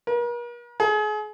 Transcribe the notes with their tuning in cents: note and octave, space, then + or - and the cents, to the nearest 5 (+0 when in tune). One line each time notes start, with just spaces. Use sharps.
A#4 +45
G#4 +35